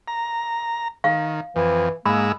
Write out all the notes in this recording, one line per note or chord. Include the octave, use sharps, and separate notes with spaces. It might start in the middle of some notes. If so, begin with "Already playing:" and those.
A#5
D#3 F5
F2 E3
G#2 G#3 A#3 B5 E6